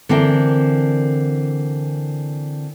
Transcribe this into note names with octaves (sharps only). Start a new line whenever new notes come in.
D3 E3 C4 E4 A#4 G5